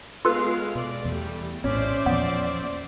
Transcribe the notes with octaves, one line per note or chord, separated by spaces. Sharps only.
G#3 B3 F4 A4 B4 F5
B2 D5
E2 G3 A3
A#1 A2 C#4 C5 D5 E5
E2 A#2 F3 B3